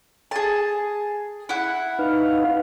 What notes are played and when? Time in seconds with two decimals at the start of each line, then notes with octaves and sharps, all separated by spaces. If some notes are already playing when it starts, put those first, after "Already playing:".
0.31 G#4 A5
1.49 E4 F#5
1.99 D#4 B4 F5